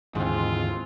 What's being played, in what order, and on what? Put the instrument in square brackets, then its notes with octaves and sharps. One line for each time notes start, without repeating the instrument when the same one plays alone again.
[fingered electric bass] D#2 D3 E3 [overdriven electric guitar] G#2 [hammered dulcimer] G#3 C4 [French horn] F4